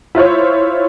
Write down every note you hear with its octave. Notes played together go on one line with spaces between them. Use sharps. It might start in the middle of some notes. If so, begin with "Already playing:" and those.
E4 F4 C5 C#5